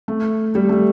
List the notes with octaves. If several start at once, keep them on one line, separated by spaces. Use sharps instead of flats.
A3
G3
A3